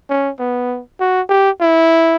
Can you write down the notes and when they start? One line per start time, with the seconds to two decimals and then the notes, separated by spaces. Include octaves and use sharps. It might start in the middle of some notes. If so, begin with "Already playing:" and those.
0.10 C#4
0.39 B3
1.00 F#4
1.29 G4
1.61 E4